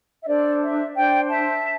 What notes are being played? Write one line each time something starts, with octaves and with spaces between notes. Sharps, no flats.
E5
D4 A4 C5 D5
E5
D4 C5 D5 G5
E5 A5